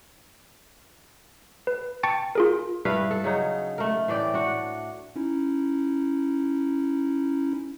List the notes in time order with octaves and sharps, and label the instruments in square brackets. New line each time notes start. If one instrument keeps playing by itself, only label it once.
[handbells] B4
G5 A5 C#6 A6 C#7
F4 G#4 A#4
[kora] G2 E4 B4 F5
A4
C#3 F#3 D#4
A3 A#4
A2 E3 D5 G5
D4 F#4
[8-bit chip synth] C#4 D#4 E4